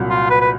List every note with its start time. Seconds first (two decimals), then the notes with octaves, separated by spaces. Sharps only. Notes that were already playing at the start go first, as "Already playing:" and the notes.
Already playing: C2 A#2 F#3
0.10 F4
0.30 B4
0.41 B4